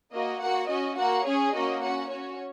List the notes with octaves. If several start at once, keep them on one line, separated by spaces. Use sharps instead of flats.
A#3 F#4 D#5
A#3 F#4 F#5
C#4 F#4 D#5
A#3 F#4 F#5
C#4 G#4 C#5
A#3 C#4 F#4 D#5
C#4 F#4 F#5
C#4 F#4 C#5